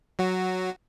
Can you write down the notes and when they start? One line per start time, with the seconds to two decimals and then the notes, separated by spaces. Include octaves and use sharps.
0.19 F#3 F#4